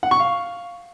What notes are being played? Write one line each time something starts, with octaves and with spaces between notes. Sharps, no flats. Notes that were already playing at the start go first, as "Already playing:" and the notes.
F#5
C#6
F5